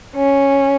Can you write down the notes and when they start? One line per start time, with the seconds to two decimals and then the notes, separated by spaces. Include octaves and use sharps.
0.14 C#4